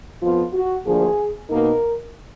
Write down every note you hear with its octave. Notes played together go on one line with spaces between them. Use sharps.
F2 F3 B3 F4
F#4
D2 D3 F3 A#3 G#4
B2 A#3 D#4 A#4